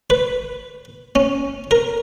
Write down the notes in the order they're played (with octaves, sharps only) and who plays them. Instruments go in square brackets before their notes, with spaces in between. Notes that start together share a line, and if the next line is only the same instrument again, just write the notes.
[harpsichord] B4
C#4
A#4